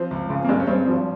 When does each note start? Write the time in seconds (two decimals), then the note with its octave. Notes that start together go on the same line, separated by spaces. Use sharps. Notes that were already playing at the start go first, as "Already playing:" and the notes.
Already playing: F3 C4
0.11 C#2
0.30 C#3
0.44 A#3
0.49 G2 G#3
0.60 C#4
0.67 G2 C4
0.86 G#1 F3